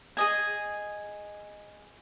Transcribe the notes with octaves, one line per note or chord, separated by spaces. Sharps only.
G#4 D#5 G#5